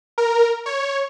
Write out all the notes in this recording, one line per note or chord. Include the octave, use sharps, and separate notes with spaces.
A#4
C#5